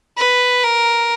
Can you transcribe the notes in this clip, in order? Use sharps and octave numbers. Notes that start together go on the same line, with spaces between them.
B4
A#4